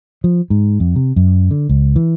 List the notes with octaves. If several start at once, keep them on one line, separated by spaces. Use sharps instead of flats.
F3
G#2
F2
C3
F#2
D3
C#2
E3